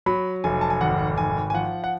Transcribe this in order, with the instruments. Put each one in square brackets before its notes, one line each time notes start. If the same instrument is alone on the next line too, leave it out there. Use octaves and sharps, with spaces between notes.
[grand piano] F#3 B5
F1 G#5
A5
G#5
G#1 F#5
G#1 G#5
G#5
F3 F#5
F#5